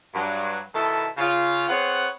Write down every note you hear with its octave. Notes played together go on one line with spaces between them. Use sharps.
G2 F#3
B2 D#3 E4 A4
C#3 F4
B3 C4 G#4 C#5 F#5